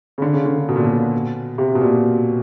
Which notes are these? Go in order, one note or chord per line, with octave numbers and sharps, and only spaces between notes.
C#3
D3
C#3
D3
C#3
B2
A#2
B2
C3
B2
A#2